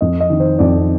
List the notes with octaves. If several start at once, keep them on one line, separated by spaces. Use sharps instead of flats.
F2 D#5
D#5
D#3
C5
F2 D5